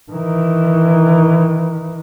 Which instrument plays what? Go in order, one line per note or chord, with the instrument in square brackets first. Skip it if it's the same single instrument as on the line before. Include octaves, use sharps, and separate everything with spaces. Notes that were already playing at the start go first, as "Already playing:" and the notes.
[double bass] D#3 E3